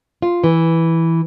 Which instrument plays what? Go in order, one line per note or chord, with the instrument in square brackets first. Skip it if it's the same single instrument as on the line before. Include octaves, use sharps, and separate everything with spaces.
[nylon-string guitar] F4
E3